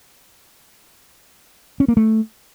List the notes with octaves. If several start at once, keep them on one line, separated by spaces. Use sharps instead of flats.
C#4
A#3
A3